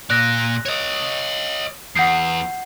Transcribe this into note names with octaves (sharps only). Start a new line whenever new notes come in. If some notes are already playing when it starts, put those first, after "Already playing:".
A#2 D5 F#6 A#6
C#5 D#5
E2 F#5 G6 C7